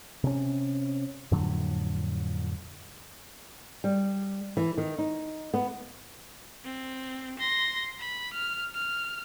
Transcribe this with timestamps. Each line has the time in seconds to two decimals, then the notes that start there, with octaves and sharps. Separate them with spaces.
0.24 C3 C#4
1.32 F2 A2 D3 F#3
3.84 G3
4.57 E3
4.77 D#3
4.98 D#4
5.54 B3
6.64 C4
7.39 C6 A#6
7.99 B5
8.34 F6
8.74 F6